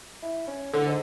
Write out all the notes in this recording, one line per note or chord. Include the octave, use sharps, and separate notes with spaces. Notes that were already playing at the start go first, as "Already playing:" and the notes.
E4
C#4
A2 D3
G#2